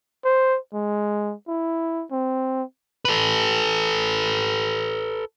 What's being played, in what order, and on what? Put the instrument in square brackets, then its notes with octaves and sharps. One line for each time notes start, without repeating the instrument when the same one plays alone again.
[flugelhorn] C5
G#3
E4
C4
[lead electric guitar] A4 B4